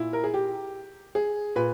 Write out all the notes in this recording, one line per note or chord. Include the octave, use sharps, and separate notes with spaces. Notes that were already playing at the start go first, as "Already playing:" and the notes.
Already playing: A#2 E4
A#4
G#4
G4
G#4
A#2 B4